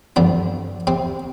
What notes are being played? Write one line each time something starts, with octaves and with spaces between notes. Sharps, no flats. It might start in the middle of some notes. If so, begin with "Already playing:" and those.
G2 D3 F3 D4
C3 C4